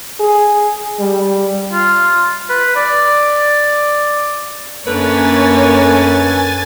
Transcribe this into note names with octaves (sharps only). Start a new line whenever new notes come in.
G#4
G3
F4
B4
D5
F#2 D3 A3 A#3 B4 C#5 G#5 A6